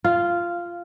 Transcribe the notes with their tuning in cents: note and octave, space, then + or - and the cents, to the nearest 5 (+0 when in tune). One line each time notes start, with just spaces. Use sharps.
F4 -10 F5 +0